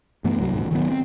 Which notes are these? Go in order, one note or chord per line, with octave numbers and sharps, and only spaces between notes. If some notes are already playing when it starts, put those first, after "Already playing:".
G2 E3 A3 B3
C2 F#3
D#1 G#2
D#3 F#3 B3
C4